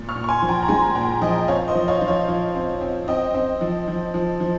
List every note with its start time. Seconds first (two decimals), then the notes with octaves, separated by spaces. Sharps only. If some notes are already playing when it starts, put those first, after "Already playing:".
Already playing: A#2
0.09 C#6 F6
0.15 A#2
0.24 C#6
0.28 G#5 C6
0.42 F3
0.49 G5 A#5
0.63 A#5
0.68 G#3 G#5 C6
0.95 A#2 G5 A#5
1.21 F3 D#5 G5
1.48 C4 C#5 F5
1.68 C5 D#5
1.75 F3
1.88 C#5 F5
2.01 F3
2.08 C#5 F5
2.28 F3
2.54 C4
2.81 C4
3.08 C4 D#5 G5
3.34 C4
3.61 F3
3.88 F3
4.14 F3
4.40 F3